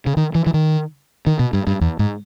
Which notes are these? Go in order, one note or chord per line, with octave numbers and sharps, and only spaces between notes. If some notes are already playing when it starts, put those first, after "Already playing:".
C#3
D#3
E3
E3
D#3
D#3
B2
G2
G2
E2
G#2